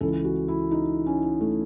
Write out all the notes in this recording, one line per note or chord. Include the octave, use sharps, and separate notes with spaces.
C#2 C#3 E3 A4
F#4
E4
D#4
C#4
A3